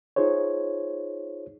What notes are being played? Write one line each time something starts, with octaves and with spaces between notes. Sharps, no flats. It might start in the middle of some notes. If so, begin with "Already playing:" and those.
D#4 F4 G#4 C5 C#5